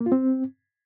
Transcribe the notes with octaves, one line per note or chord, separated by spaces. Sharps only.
A#3
F4
C4